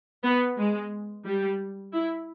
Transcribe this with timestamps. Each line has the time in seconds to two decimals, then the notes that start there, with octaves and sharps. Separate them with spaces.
0.23 B3
0.57 G#3
1.25 G3
1.93 E4